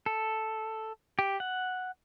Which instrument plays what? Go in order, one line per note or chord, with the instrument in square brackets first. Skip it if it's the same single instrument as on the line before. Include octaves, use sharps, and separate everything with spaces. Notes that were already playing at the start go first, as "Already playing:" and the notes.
[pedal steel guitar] A4
G4
F#5